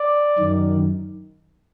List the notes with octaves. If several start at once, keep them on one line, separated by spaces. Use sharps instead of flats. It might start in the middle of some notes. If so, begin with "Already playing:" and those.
Already playing: D5
F#2 D#3